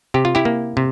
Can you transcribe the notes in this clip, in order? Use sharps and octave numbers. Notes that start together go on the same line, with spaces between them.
C3 G4
F4
E4 G4
A#3
C3